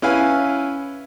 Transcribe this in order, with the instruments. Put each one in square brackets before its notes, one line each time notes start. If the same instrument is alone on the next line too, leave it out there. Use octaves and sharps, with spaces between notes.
[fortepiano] C#4 E4 B4 F5 G#5